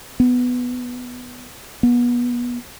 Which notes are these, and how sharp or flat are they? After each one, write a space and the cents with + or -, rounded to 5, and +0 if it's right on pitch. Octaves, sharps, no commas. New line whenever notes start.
B3 +5
B3 -30